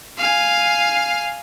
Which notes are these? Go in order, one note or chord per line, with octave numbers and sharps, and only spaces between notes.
F5 G#5